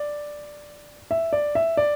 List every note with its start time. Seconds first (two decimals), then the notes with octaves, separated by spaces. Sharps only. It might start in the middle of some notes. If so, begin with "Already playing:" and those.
Already playing: D5
1.11 E5
1.33 D5
1.55 E5
1.77 D5